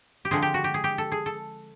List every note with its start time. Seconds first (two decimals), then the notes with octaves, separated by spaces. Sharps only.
0.25 G4
0.31 D3 F3 G#3 C4 G#4
0.42 G4
0.54 F#4
0.64 G4
0.74 G#4
0.84 G4
0.98 A4
1.12 G#4
1.26 A4